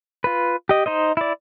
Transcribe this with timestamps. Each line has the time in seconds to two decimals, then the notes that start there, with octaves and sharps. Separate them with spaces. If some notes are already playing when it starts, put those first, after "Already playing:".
0.24 F4 B4
0.69 G4 D#5
0.86 D#4 C5 D#5
1.17 E4 D5